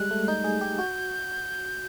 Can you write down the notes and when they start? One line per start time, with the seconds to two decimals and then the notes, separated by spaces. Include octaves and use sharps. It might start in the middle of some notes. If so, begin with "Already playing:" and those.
Already playing: G3 G#3 F#6
0.11 A3
0.28 D#4 G6
0.44 G#4
0.61 G4
0.79 F#4